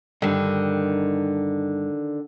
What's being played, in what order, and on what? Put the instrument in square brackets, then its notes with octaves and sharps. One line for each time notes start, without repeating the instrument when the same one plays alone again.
[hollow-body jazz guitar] G2 [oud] D3 D#3